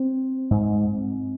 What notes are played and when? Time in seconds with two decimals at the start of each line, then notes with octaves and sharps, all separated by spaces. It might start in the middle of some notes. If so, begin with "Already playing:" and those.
Already playing: C4
0.51 G#2